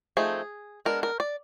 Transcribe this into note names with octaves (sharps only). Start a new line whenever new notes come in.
F3 A3 C4 D#4 G#4
G#3 B3 D4 A#4
A#4
D5